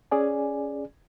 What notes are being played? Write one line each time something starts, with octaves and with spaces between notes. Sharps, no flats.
C#4 G#4 D5 G#5